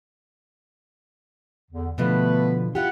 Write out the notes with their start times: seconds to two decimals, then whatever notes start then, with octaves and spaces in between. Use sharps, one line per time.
1.71 E2 D3
1.98 B2 D3 F3 A3 B3 B4
2.75 E4 F4 G4 F#5